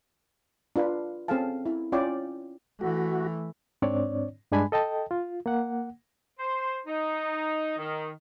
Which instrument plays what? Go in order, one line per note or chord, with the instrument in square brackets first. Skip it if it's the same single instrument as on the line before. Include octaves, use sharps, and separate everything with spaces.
[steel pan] D4 F4 B4
C4 C#4 G#4 A4 F5 A5
E4
C#4 F4 C#5 D5 G5 B5
[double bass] E3 A3 [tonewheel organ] F#4
[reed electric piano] G#2 C4 D4 C#5 D5
G2 G#3 D4 G#5 B5
A4 D#5 G5 A5
F4
A#3 F#5
[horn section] C5
D#4
D#3